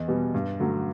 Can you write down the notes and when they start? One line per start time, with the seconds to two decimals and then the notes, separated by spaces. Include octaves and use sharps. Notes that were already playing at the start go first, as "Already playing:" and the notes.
Already playing: E2 D#5
0.08 B2 G3 B3
0.34 G2
0.60 D3 F#3 A3